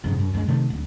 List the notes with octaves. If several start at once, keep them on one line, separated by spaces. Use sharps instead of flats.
F#1 F2 G#2 C3
F#2
D1 F#2 E3 G#3
C3 D#3 A3
D1